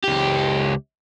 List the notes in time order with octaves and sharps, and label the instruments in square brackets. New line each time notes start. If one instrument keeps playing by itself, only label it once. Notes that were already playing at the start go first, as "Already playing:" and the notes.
[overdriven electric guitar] C#2 G4